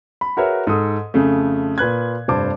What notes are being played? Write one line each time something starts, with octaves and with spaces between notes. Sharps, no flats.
B5
F#4 G#4 A#4 B4 C#5 E5
G#2 A4 D#6
F2 C#3 A3
A#2 B4 F#6 G#6
F1 G2 C5 A5 D6